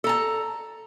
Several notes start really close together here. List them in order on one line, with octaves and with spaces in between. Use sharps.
A4 A#5 A5